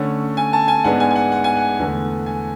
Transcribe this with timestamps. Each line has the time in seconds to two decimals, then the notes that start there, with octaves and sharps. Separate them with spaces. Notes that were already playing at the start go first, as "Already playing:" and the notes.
Already playing: D3 A3 C#4 F#5
0.37 G#5
0.53 A5
0.68 G#5
0.84 G#2 G#3 B3 D4 F#5
1.00 G#5
1.11 G#5
1.16 F#5
1.32 F#5
1.44 G#5
1.57 F#5
1.79 E2 D3 A3
2.26 G#5